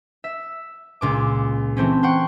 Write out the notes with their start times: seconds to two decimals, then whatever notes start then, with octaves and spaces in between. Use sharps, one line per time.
0.24 E5
1.01 C#2 A#2 D6
1.77 E3 A3 C4 C#4
2.03 C5 F#5 G5 C#6